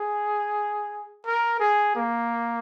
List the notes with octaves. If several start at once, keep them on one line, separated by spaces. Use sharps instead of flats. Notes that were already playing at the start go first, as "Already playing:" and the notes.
Already playing: G#4
A#4
G#4
A#3